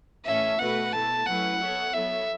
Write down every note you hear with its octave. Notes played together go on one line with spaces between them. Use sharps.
A2 E3 C#4 A4 E5
B2 A3 F#4 B4 F#5
B2 A3 E4 A5
F#3 A3 C#4 E4 B4 F#5
B3 A4 C#5 E5
F#3 B3 E4 A4 C#5 E5